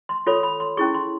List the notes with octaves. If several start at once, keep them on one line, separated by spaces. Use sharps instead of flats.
C6
F4 A4 C#5 B5
B5
C6
C#4 E4 G#4 C#6
C6